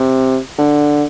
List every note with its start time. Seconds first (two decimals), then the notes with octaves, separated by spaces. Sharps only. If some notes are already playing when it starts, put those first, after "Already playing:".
Already playing: C3
0.58 D3